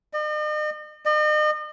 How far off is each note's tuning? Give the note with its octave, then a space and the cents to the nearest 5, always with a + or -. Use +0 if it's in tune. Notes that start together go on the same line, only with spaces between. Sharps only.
D#5 -45
D#5 -40